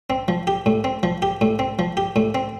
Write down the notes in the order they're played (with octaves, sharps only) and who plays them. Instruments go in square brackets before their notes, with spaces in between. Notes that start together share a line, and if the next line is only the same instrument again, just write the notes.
[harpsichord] C4
F3
G4
A2
C4
F3
G4
A2
C4
F3
G4
A2
C4